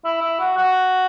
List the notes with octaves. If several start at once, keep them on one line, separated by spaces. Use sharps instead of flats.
E4
E4
F#4
F#4